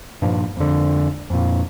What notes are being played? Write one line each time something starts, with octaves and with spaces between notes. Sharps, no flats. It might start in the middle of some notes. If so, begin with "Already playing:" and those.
G2 A#2 F3
F2 D3
F2 A#2